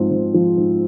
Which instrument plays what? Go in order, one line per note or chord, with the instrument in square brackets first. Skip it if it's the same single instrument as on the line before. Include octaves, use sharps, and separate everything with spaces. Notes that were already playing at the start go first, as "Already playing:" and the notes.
Already playing: [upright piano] G#2 F3 C4
G#2
F3
G#2